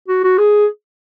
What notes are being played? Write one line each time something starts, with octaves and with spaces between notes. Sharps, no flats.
F#4
F#4
G#4